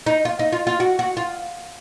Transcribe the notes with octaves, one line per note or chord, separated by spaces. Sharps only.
D#4
F4
D#4
F4
F4
F#4
F#4
F4